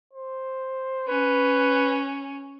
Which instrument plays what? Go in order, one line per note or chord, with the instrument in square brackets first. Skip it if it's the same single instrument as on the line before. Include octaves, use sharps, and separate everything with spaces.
[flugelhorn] C5
[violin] C#4 [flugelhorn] B4